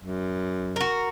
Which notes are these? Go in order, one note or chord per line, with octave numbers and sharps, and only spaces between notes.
F#2
F#4 A#4